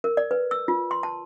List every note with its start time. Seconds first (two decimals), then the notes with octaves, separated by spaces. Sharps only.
0.04 A#4
0.17 D5
0.31 B4
0.51 E6
0.68 F4
0.91 C6
1.03 A5